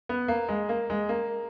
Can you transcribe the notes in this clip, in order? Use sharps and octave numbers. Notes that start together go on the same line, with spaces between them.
B3
A#3
G#3
A#3
G#3
A#3